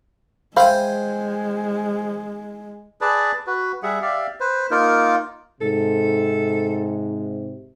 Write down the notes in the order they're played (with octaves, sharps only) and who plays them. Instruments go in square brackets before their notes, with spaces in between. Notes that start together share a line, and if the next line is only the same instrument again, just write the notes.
[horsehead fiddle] G#3 [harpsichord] C5 G5 G#5 [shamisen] E5 F5 B5
[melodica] G#4 B4 D5 A5
F#4 B4
G3 G#4 E5 F#5
G4 D5 E5 F5
B4 C5
A#3 D#4 F4 A#4
[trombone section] G#2 C3 [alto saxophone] A4